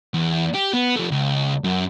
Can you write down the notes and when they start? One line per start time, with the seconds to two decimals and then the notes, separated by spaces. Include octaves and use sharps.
0.14 E2
0.54 G4
0.74 B3
0.96 F3 A3
1.11 C#2
1.64 F#2